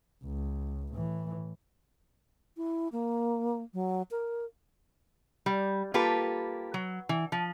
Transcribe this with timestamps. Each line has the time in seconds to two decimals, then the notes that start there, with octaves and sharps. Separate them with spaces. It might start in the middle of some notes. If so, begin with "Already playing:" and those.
0.24 C#2
0.94 A2 E3
2.57 E4
2.92 A#3
3.74 F#3
4.11 A#4
5.46 G3
5.94 A#3 F4 G4 A4 B4
6.74 F#3
7.09 E3
7.32 F3